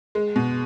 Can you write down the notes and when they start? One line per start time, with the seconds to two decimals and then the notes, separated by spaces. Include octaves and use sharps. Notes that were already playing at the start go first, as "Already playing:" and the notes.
0.15 G#3
0.36 B2